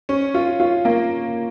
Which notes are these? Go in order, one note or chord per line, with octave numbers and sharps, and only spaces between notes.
C#4
F4
F4
A#3